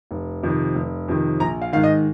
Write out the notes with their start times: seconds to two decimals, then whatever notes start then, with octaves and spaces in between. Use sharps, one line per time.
0.11 F1
0.43 F2 C3 D#3
0.75 F1
1.08 F2 C3 D#3
1.40 A#1 A#5
1.62 F5
1.72 G#2 D#3 F5
1.83 D#5